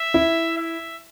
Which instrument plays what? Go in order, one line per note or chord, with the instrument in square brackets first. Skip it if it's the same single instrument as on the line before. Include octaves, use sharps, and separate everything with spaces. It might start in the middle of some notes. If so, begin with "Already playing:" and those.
Already playing: [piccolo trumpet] E5
[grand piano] E4
[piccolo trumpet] E5